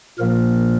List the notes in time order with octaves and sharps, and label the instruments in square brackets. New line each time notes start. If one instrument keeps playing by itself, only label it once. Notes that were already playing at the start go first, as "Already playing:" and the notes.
[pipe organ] A#2 F3 A#3 A#4